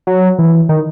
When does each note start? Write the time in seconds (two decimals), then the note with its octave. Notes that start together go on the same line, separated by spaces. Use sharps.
0.07 F#3
0.39 E3
0.69 D#3